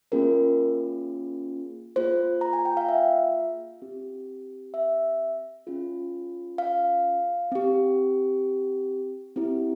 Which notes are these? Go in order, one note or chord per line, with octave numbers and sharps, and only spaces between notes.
A#3 C#4 F4 G#4 A#4
A#3 F4 G#4 C5
A#5
G#5
G5
F5
E5
C4 G4
E5
C#4 F4 G#4
F5
C4 G4
C4 E4 G4